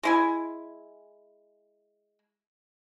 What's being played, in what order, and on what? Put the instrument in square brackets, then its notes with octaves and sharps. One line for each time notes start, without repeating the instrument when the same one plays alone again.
[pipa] G#3 E4 G#5